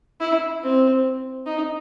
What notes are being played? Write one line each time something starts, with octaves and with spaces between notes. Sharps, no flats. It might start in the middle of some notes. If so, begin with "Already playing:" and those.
E4
C4
D#4